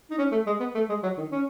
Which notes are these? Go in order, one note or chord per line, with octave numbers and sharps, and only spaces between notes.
D#4
C#4
A3
G#3
B3
A3
G#3
F#3
D#3
C#4